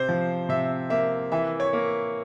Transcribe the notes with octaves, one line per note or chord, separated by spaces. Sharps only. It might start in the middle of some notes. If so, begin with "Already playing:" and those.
Already playing: C3 C5
F3
C3 E5
A#3 E5
E3 E5
C#5
A#3